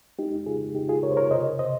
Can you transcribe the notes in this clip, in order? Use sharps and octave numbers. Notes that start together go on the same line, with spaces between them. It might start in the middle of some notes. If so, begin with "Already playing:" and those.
G#3 D#4 G4
C#3 F4 G#4
C#3 D#4 G4
F4 G#4
C#3 A#4 C#5
C5
A#4 C#5
C3 C5 D#5
C3 C5 D#5